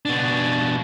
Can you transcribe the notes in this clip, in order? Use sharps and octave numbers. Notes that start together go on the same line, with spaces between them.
B2 D4